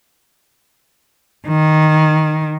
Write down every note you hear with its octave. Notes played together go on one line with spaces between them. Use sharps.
D#3